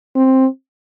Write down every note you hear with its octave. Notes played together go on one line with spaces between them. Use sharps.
C4